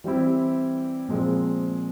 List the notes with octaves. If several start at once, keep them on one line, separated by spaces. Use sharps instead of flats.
E3 G3 C4 E4 G4
A#2 F3 G#3 C4